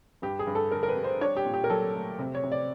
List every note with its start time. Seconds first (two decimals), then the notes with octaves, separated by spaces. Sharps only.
0.22 G2 G4
0.39 G#4
0.47 G2
0.55 A4
0.71 D3 A#4
0.83 A#4
0.89 B4
0.96 G3
1.04 C5
1.21 D4 C#5
1.37 G4
1.46 A#2
1.54 G4
1.64 A#4
1.70 F#3 A4
1.95 A3
2.19 C3
2.35 C#5
2.44 C3
2.52 D5